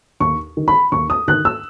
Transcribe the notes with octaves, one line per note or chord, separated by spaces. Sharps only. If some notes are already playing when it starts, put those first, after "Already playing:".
D#2 C#6
D#3
B5
D#2 C#6
D#6
D#3 F#6
E6